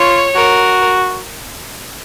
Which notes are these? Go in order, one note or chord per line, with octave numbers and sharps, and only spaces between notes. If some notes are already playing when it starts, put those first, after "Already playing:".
Already playing: F4 C#5
F#4 A#4